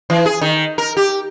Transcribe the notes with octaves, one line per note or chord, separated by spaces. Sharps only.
E3
G#4
D#3
A#4
G4